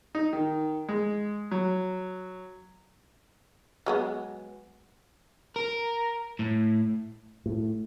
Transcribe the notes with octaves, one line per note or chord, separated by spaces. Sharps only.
D#4
D#3
G#3
F#3
F#3 G#3 B3
A#4
A2
A2